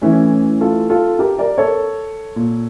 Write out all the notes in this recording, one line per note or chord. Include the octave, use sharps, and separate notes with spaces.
A2 E3 C#4 E4
F4 A4
F4 A4
G4 A#4
A#4 D5
A4 C#5
A#2